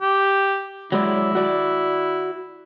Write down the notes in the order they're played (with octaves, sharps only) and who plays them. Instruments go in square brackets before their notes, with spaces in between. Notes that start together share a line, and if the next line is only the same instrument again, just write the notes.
[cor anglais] G4
[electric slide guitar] F#3 G#3 D5 [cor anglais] E4
[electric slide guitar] F#4 D5